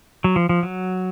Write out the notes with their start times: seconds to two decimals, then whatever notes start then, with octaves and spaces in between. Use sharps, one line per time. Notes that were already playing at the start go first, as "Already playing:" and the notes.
0.24 F#3
0.36 F3
0.49 F3
0.63 F#3